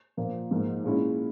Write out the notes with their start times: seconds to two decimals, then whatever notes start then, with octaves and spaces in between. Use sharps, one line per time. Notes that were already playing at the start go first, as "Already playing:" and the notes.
0.17 A#2 F3 A#3
0.51 G#2 F3 A#3
0.84 A#2 G#3 C#4 E4